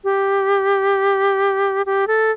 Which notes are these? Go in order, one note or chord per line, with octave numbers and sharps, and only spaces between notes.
G4
G4
A4